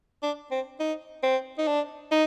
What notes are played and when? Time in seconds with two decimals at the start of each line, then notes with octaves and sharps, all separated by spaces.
0.23 D4
0.51 C4
0.80 D#4
1.23 C4
1.58 D#4
1.67 D4
2.11 D#4